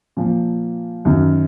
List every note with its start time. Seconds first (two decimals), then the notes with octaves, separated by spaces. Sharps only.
0.17 A#2 F3
1.05 F#2 D#3 F#3